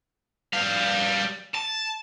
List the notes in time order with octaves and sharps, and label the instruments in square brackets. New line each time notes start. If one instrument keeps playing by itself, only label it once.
[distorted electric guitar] G3 F5
A5